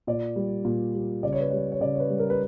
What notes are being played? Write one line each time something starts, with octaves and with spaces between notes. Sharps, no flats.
A#2 D5
G3
A#2
G3
C#3 D5
C#5
B4
G3 C#5
C#5
C#3 D5
C#5
B4
G3
A#4
B4